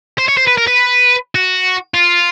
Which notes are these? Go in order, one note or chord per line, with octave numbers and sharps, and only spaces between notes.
C5
C#5
C5
B4
A#4
B4
F#4
F4